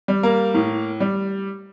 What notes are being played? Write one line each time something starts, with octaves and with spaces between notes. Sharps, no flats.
G3
A#3 A#4
A2
G3